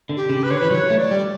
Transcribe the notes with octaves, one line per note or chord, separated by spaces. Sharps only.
D3
G4
C#3
B4
D3 C#5
E3 B4
F#3 C#5
A3
D5
G3